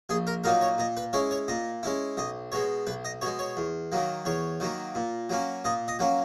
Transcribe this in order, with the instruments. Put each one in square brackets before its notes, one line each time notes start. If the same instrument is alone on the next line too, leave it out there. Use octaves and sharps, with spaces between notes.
[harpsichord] A#1 G#4
A#4
A#2 F#3 A#3 D#4 A#4
C#5
A#2 D#5
B4
G#3 C#4 E4 C#5
C#5
A#2 D#5
G#3 C#4 E4
B1 D#5
B2 G#3 C#5
B1 B4
D#5
B2 G#3 C#5
C#5
E2
D#3 F#3 A#3
E2 C#5
D#3 F#3 A#3
A#2
F#3 A#3 C#4
A#2 D#5
D#5
F#3 A#3 C#4